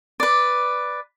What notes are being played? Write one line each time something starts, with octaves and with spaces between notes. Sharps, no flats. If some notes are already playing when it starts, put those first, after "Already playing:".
B4 D5